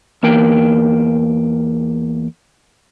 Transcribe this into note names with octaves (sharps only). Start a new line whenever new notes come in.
E2 A#3 A#4 G5